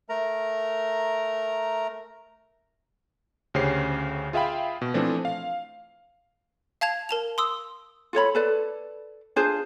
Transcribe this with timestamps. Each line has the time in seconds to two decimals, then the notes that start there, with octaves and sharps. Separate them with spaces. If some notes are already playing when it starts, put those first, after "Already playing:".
0.09 A3 A#4 A#5
3.54 D2 C#3 C#4 G4 C5 C7
4.33 F4 G#4 E5 F5 G5 B5
4.81 B2
4.94 E3 F3 A3 C4 D4
5.25 F5
6.81 F5 A5 G#6 F7
7.09 A#4 A5 F7
7.38 C6 D#6 E6
8.13 F4 A4 C#5 B5
8.35 A4 B4 D5
9.36 D4 F4 G#4 C5